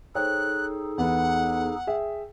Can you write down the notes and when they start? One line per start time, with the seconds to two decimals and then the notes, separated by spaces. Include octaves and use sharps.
0.15 D#4 G#4 A4 C5 C#5 G5 F#6
0.98 E2 B3 F#5
1.87 G#4 E5 G5